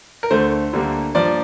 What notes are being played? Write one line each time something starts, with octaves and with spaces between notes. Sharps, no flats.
A#4
D2 D3 A3 C5
D2 D3 G3 A#3
G2 F3 A#3 D5